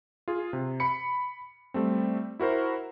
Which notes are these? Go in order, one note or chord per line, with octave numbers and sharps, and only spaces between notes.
F4 G#4
C3
B5 C#7
G3 A3 C4
E4 F#4 A#4 C5